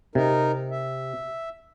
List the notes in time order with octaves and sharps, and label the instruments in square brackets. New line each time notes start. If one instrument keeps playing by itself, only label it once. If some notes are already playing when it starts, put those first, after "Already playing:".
[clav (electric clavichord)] C3 [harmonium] D#4 A#4
[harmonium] E5